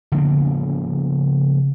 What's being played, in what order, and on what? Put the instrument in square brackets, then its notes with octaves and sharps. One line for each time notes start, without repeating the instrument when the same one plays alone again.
[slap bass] C#3 F3 A#3 B3